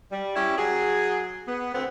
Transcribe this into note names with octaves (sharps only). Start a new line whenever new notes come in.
G3
C#4 E4 G4
F#3 G#4
B3
D2 B3 C4